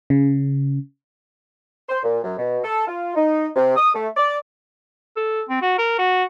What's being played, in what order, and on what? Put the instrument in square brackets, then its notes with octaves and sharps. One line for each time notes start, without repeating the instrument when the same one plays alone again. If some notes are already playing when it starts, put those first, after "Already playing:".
[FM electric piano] C#3
[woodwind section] C5
A#2
F#2
B2
A4
F4
D#4
C3
D#6
A3
D5
[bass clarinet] A4
C4
F#4
A#4
F#4